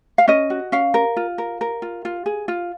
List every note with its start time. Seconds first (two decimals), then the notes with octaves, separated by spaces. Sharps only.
0.18 F5
0.28 C#4 D#5
0.50 F#4
0.72 C#4 F5
0.94 A#4
1.17 F4
1.38 A#4
1.61 A#4
1.82 F4
2.05 F4
2.26 G#4
2.48 F4